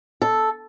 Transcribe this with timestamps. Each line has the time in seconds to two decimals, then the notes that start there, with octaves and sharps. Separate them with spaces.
0.22 A4